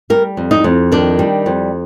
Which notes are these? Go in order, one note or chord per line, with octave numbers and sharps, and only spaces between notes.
G3 A#4
F2
D#4
F2
D#3 D4
G3
F2